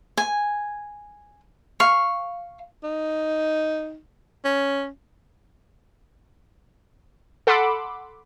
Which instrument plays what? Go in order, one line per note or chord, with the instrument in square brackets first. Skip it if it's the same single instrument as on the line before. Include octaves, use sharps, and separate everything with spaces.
[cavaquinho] G#5
F5 C#6
[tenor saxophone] D#4
C#4
[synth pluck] A4 F#5 B5 C6 D6 E6